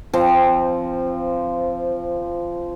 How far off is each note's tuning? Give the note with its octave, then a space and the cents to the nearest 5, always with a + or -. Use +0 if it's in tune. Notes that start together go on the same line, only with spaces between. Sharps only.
F3 -15 C4 +0